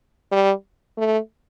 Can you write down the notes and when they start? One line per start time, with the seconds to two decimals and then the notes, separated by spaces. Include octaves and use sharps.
0.31 G3
0.97 A3